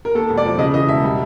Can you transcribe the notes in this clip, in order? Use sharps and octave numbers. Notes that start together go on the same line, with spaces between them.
A#4
D#2 A4
E1
D5
F3
C#3 D#5
E3 D#5
E1 E5
G3